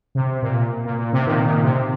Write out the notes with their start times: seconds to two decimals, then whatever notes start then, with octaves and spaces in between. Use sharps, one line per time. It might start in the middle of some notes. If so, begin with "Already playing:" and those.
0.15 C3
0.42 A#2
0.85 A#2
0.99 A#2
1.13 C3
1.26 A#2 D#3
1.45 A#2 D#3
1.63 C3